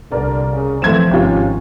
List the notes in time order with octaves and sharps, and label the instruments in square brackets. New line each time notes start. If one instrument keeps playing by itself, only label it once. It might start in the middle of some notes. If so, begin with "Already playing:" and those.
[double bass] C2 [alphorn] D3 [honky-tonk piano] A#4 D5
[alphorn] C#3
[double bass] E3 F3 [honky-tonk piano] A3 G#6 E7 [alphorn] C4
[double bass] G#1 [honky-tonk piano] C3 F4 [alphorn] C#4